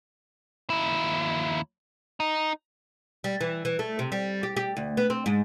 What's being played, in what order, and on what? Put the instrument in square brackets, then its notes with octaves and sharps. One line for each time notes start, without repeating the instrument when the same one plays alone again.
[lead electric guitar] D#2 E4
D#4
[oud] G3
E3
E3
A3
C3
G3
G4
G4
D2
B3
C4
G#2